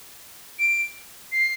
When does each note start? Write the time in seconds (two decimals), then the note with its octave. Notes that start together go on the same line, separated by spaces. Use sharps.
0.59 D7
1.32 C7